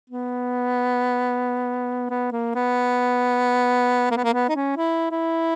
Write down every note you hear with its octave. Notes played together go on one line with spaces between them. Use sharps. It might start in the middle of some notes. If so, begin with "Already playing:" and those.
B3
B3
A#3
B3
A#3
B3
A#3
B3
D#4
C#4
E4
E4